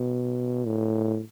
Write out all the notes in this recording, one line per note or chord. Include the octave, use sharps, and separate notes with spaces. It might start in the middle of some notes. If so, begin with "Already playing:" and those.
Already playing: B2
A2